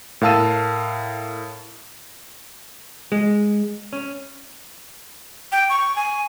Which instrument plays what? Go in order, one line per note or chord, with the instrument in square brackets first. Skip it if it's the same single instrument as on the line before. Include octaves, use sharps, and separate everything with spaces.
[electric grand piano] A2 A#4 F5 A5 E6 D#7
[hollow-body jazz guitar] G#3
C#4
[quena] G5
C#6
G#5